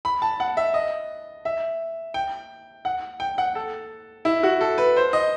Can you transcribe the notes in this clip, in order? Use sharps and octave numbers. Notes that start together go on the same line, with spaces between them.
B5
A5
F#5
E5
D#5
E5
G5
F#5
G5
F#5
A4
E4
F#4
A4
B4
C5
D#5